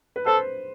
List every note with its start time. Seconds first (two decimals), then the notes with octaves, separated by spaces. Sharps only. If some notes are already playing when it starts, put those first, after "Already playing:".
0.16 B4
0.26 A4 C5